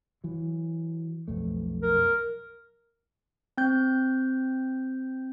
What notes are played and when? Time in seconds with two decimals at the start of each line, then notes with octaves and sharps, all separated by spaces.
0.24 E3 F#3
1.28 B1 F2 A3
1.83 A#4
3.58 C4 G6